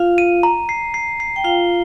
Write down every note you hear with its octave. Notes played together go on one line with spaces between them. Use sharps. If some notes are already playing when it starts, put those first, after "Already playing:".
Already playing: F4 F5
D#7
A#5
C7
C7
C7
G5
F4 F5 G7